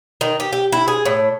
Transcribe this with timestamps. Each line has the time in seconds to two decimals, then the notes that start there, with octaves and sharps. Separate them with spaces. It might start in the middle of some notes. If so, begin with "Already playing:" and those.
0.21 D#3
0.40 G4
0.53 G4
0.72 E4
0.88 G#4
1.05 A2